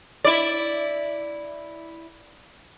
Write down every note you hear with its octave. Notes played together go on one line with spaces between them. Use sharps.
E4 D5